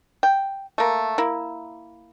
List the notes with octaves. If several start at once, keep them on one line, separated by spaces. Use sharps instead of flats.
G5
A3 A#3
A#3 E4